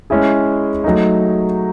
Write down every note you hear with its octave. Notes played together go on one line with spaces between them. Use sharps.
G#3 C#4 E4 G#4
F#3 A3 D#4